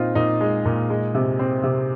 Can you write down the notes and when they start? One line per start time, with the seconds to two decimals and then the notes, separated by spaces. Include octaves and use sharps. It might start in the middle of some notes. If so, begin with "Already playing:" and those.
Already playing: A#2 C4 D#4 F4
0.15 A#2 D#4
0.41 G#3
0.65 A#2
0.90 G#3
1.15 C3
1.39 C4
1.64 C3